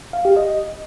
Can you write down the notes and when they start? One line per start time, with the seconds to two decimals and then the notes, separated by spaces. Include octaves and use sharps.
0.13 F5
0.25 G4
0.37 D#5